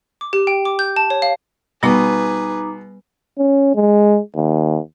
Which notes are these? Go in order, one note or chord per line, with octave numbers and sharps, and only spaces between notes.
D6
G4
G5
D6
G6
A5
C#5
F5
B2 G3 B3 D#4 G#4 B4 A#5 D6
C#4
G#3
D#2